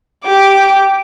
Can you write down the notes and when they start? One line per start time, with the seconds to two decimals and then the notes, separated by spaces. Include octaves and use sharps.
0.25 G4 D6